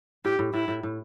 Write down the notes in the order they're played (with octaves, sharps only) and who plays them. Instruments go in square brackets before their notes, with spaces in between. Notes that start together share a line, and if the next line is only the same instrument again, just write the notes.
[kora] A2 [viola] G4
[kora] A2
[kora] A2 [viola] E4
[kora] A2
A2